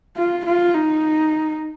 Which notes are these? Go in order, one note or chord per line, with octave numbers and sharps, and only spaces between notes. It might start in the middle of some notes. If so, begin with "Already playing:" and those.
F4
F4
D#4